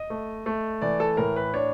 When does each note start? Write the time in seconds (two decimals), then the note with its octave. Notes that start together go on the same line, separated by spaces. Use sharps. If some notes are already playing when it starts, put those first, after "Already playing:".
Already playing: D#5
0.10 A3
0.46 A3
0.82 E3 D5
1.00 A4
1.17 A2 A#4
1.36 B4
1.54 D4 C#5